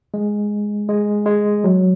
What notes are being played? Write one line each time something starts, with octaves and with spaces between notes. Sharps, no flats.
G#3
G#3
G#3
F#3